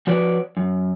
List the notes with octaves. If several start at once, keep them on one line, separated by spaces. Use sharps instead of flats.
F3 F#4 B4 C#5 D5
F#2